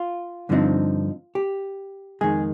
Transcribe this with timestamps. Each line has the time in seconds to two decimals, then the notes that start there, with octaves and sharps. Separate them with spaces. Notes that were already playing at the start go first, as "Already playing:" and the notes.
Already playing: F4
0.49 G2 D3 F3 C4 D#4
1.35 G4
2.21 F2 D#3 G#3 G#4